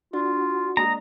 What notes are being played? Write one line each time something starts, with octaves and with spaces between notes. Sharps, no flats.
D4 F4 F#4
G#3 A#3 D4 D#5 A#5